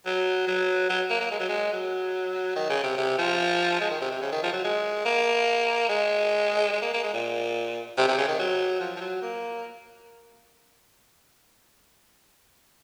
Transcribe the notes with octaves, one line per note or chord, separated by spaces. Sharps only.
F#3
F#3
F#3
A#3
A#3
G#3
F#3
G#3
F#3
D#3
C#3
C3
C3
F3
G#3
D#3
C3
C3
C#3
D#3
F3
F#3
G#3
A#3
G#3
G#3
A#3
A#3
G#3
A#2
C3
C3
C#3
D#3
F#3
F3
F3
F#3
A#3